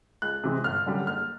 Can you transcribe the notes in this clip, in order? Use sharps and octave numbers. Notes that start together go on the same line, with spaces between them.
C#2 F#6
C3 E3 G#3
G1 F6
F#2 D3 G3
F#1 F6